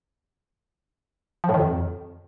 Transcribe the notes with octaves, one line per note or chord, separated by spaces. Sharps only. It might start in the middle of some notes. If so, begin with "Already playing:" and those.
F3
A2
D#3
F2